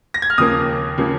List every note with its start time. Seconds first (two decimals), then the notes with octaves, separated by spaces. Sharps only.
0.14 A#6
0.22 G#6
0.30 F6
0.38 D#2 C#3 F3 A#3 D#6
0.98 C#3 F3 A#3